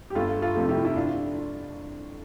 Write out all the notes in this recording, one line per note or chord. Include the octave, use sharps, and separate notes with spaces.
G4
G1 F4 A4
F4 A4
F2 C3 F3 A3
E4 G4
E4
D4 F4